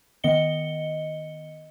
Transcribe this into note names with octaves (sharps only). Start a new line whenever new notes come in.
D#3 B3 D#5 C#7 G7